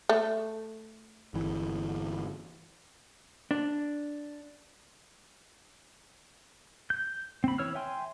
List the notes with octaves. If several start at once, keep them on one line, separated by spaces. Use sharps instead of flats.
A3
G1 E3
D4
G6
C4 B5
E3 C#5 E6 F6
E5 G5 G#5 C6